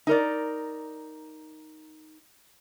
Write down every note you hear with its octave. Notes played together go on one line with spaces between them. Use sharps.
D#4 A#4 D5